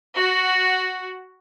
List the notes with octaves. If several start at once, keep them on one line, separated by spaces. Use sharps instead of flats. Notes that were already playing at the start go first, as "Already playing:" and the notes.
F#4